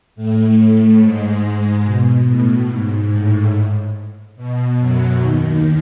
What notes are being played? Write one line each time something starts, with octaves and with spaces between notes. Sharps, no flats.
A2 A3
G#2 G#3
B2
A2
G#2
A2
B2
F#2 F#3
D#2 D#3